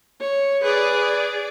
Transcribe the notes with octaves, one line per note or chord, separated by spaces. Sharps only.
C#5
G#4 B4 D5